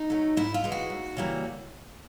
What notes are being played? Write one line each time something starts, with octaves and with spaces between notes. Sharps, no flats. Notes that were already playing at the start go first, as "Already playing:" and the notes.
Already playing: D#4
F#3 A3
G#2 E4
F4
E3 G#3
F#4
D#2
C#3 E3 G3 A#3